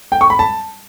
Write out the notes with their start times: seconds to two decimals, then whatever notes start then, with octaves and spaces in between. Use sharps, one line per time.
0.12 G5
0.21 C#6
0.30 B5
0.39 A5